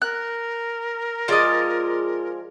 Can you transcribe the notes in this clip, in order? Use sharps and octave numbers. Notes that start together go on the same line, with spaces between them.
A#4 F#6
F3 G#3 F4 D5 D#5